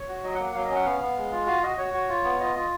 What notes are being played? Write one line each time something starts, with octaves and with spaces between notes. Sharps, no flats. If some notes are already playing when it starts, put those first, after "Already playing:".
Already playing: C#5
F#4
F#3 D#5
F#5
A#3
F#5
F#3 F5
D#5
C#4
F#5
B3 F5
B3
G#3
F4
F#4 F5
F#4 D#5
F#4 C#5
F#4
F4
B3
F4 D#5
F4